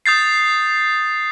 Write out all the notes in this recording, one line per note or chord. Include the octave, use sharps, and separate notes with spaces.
D#6 G6 A6 C7